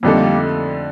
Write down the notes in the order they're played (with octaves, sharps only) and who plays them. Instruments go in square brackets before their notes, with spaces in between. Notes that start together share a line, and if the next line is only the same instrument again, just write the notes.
[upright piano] F2 D3 A3 D#4 A4 [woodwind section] G3 A#3